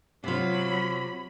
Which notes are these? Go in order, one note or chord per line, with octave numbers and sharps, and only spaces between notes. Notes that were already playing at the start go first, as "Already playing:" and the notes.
C3 F#3 F4 B5